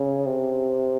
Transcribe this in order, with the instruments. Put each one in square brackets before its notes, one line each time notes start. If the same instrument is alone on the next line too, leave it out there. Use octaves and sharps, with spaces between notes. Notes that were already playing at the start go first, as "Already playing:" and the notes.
Already playing: [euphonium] C#3
C3